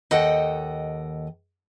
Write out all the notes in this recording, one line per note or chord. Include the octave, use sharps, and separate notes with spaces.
D#2 A4 D#5 F#5 G5